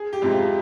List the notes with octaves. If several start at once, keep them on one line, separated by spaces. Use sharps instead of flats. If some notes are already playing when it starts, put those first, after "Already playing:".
Already playing: G#4
G4
F2 C3 F3 G#3
F4